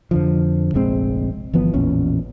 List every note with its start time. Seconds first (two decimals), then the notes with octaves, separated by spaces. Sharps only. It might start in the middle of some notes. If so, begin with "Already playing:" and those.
0.11 F2 D3 F3
0.74 F1 A#1 G#3 C4
1.54 G1 E3 F3 B3
1.74 A1 E2 A#2 C#4